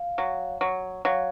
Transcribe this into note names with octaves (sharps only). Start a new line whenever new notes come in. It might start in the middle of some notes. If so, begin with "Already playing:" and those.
Already playing: F5
F#3
F#3
F#3 F5